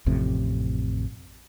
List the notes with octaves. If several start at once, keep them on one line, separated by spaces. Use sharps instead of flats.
A1 F2 A2 C3